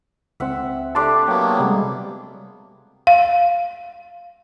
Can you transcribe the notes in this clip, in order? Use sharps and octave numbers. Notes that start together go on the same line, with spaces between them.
C#2 C4 E5 F#5
A3 D4 G4 A5 C6 D6
F#3 A#3 B3 C#5 G5
C3 G3 G#3
F5